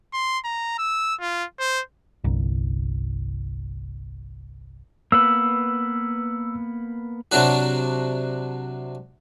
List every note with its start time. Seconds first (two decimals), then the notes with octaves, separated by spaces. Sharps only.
0.13 C6
0.45 A#5
0.78 E6
1.20 F4
1.60 C5
2.24 G1 C2
5.12 A#3 B3 B4 E6
7.32 C3 F#3 D4 F#4